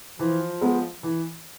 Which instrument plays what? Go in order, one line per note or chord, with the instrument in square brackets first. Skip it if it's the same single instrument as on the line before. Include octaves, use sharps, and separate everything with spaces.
[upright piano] E3 [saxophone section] F3
[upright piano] G#3 B3
E3